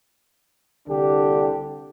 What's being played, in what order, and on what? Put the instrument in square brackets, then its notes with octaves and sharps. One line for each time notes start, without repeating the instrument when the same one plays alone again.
[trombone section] C2 D3 D4 G4